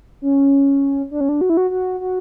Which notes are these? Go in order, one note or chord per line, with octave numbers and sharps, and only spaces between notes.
C#4
D4
C#4
D4
F#4
E4
F#4
F#4
F#4